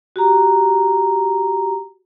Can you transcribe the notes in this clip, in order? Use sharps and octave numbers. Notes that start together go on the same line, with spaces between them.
F#4 G4 A#5